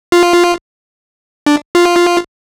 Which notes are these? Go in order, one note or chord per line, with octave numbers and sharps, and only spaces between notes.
F4
D4
F4